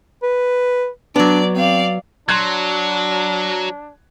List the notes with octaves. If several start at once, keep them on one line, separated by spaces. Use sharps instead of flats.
B4
F#3 B3 D4 D5
C4 D5 F5
F#3 D4 C6 F#6 G#6